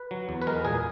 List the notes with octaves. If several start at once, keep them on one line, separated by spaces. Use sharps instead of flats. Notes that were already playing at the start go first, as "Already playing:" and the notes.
Already playing: B4
F#3
E2
B4
G#3 A#4
A#2 G#4